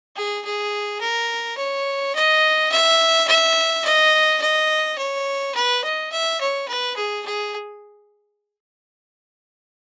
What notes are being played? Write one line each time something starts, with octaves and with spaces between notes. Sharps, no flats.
G#4
G#4
A#4
C#5
D#5
E5
E5
D#5
D#5
C#5
B4
D#5
E5
C#5
B4
G#4
G#4